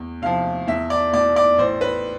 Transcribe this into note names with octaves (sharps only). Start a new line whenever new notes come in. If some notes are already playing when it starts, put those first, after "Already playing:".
Already playing: E2
C3 F3 F5
E2 E5
D5
B2 D5
D5
A1 C5
B4